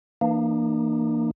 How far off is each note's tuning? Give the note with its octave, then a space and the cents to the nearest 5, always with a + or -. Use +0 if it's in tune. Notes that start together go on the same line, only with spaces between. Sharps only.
E3 +0 A#3 -5 D4 +45